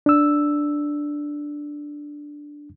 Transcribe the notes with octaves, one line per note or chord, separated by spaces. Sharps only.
D4 E6